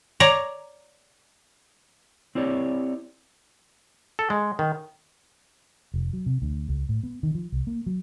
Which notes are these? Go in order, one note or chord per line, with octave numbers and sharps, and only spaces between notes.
C#5 D5 A#5
C4 E4 G4 C#5 D5
A4
G#3
D#3
F1
F#3
C3
D2
C#2
A2
B3
D#3
F3
C2
A#3
F#3